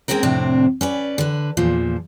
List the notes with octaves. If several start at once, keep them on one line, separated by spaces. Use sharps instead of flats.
G#3 A#3 C4 C#4 A#4
F2 A2 C3 C4 D4
C#4 B4 D5
D3 B4
E2 A#2 F3